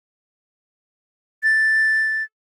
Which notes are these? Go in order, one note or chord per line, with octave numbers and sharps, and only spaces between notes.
A6